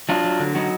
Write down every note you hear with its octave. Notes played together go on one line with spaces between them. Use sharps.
F#3 D4 F4
F#3
D3
F#3 D#4 F#4